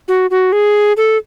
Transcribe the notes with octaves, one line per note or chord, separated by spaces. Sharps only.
F#4
F#4
G#4
A4